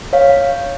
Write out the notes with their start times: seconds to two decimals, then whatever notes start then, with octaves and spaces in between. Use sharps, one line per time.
0.13 C#5 F5